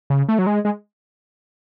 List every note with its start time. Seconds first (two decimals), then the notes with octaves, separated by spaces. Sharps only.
0.10 C#3
0.29 A3
0.39 F#3
0.47 G#3
0.65 G#3